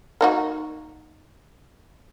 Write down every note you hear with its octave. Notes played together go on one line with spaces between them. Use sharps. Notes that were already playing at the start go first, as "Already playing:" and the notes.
A#3 D#4 F#4